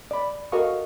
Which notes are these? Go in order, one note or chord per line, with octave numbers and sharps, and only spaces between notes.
D5 B5
F#4 A4 A#4 D#5 F5 C#6